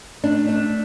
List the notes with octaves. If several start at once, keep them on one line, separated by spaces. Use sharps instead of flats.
A3 D4
D4